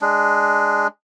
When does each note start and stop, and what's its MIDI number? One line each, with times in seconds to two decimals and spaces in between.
0.01 0.87 56
0.01 0.87 62